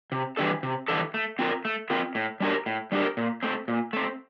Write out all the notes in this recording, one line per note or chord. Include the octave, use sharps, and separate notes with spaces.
C3
E3 G3 D4 A4
C3
E3 G3 D4 A4
A3
C4 F4 A#4
A3
C4 F4 A#4
A2
G3 D4 G4 A#4
A2
G3 D4 G4 A#4
A#2
A3 C4
A#2
A3 C4